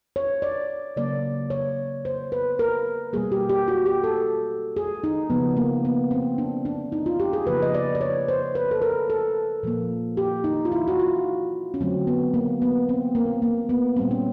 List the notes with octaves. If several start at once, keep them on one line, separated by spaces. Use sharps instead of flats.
C#5
D5
C#3 F#3 A#3 D5
C#5
C5
B4
A#4
B2 G3 A#3 G#4
G4
G4
F#4
G4
A4
G#4
D#4
C#3 F3 A#3 B3
A#3
B3
C4
D4
D4
D#4
F4
G4
G#4
C#3 F3 A#3 B4
D#5
D5
D5
C#5
C5
B4
A4
A#4
A4
A#2 F3 A#3
G4
D#4
F4
E4
F#4
F4
C#4
D3 F#3 A3 C4
B3
A#3
B3
C4
A#3
A#3
B3
A#2 G3 A#3 C4
C#4